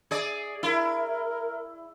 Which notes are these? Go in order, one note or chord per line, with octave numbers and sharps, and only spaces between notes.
G#4 D5
E4 A#4